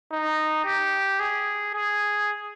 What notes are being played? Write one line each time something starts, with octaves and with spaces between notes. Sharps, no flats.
D#4
G4
G#4
G#4